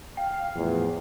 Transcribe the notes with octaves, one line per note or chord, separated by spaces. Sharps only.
F5 G5
E2 A2 F3